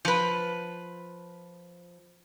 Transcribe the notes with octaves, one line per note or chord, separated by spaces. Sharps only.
F3 B4